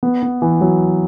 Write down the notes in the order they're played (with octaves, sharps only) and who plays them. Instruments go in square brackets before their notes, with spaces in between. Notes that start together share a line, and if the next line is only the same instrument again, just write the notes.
[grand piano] B3
B3
E3
F#3